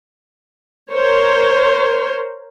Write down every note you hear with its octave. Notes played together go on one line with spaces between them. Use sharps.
A#4 C5 C#5